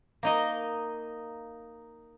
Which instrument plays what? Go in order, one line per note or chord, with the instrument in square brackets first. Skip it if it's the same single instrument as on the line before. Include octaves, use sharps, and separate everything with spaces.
[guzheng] A#3 D#4 D#5